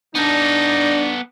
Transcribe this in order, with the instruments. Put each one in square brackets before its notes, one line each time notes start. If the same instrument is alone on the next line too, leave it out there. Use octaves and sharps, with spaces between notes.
[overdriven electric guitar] B3 A4 [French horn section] D4 [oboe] D#4